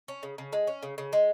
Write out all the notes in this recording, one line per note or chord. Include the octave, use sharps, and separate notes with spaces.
C#4
C#3
C#3
G#3
C#4
C#3
C#3
G#3